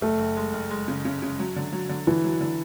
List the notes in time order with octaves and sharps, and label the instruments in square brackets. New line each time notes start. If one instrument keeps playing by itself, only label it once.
[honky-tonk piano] F#1 [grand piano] A3
[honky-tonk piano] F#1
G#3
F#1
G#3
C#3
C#3
C#3
F#3
D3
F#3
D3
[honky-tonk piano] D3 [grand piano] E3
[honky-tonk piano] F#3
D3